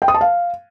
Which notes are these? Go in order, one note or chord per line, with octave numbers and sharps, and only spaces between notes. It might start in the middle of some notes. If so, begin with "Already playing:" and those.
G5
D#6
A5
F5